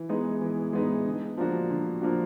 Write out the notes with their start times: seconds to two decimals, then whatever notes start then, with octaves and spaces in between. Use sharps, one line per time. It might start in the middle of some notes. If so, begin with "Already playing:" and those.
Already playing: E3
0.09 G#3 B3 D#4
0.41 E3
0.73 G#3 B3 D#4
1.05 D3
1.37 F3 A#3 D4 F#4
1.70 D3
2.02 F3 A#3 D4 F#4